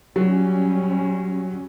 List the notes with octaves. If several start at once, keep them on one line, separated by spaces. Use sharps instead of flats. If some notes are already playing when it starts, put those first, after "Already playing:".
F#3 G3 C#4